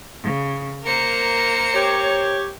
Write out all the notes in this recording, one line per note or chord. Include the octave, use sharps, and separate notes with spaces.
C#3
A#3 A#4 C5 C#7
G4 C#5